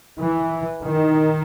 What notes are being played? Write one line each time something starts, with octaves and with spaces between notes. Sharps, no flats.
E3
D#3